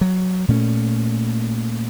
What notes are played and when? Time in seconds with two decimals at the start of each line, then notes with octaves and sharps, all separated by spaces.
0.01 F#3
0.48 A#2 A3 C#4